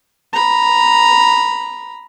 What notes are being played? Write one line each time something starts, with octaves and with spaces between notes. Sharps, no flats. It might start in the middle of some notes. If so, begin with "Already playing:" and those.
A#5 B5